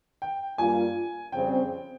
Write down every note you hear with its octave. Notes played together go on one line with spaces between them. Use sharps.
G5
G2 G3 A#3 F4 G#5
F2 C#3 G3 C4 G5